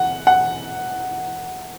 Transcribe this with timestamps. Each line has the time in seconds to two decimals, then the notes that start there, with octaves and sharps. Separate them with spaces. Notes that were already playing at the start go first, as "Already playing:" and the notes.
Already playing: F#5
0.27 F#5